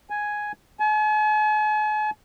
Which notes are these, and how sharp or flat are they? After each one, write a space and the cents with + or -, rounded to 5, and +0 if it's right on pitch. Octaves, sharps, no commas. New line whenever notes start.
G#5 +5
G#5 +45